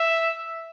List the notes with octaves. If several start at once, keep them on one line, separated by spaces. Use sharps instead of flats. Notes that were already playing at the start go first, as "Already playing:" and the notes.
Already playing: E5